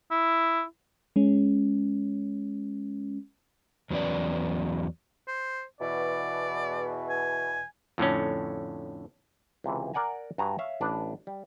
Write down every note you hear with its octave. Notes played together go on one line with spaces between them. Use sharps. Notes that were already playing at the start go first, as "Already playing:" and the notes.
E4
G#3 C#4
E2 F#3 B3 C#4 D5
C5
E2 B2 E3 D5
G#5
F2 A2 D3 C#4
C#2 C3 E3
A#4 D5 F#5 G#5 A#5
G2 F#4 G#5 A#5
C#5 E5 F5
A1 D4 B4
G3